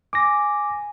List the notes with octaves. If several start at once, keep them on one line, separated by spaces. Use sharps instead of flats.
G#5 D6 A#6